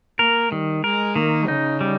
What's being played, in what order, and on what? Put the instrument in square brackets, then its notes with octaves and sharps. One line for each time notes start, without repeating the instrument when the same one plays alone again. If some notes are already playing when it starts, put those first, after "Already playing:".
[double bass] A#3 [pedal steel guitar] A#4
[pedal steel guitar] D#3 [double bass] G3
[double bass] G#3 [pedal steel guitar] A#4
[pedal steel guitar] D#3 [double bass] A#3
[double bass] C#3 [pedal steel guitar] D#4
[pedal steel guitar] G3